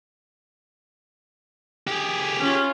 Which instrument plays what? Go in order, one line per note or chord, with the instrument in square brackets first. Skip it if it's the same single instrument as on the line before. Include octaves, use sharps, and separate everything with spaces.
[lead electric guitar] G4 G#4
[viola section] C#4 F4